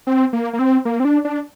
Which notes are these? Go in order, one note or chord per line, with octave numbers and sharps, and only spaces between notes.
C4
A#3
A#3
C4
A#3
C4
D4
D4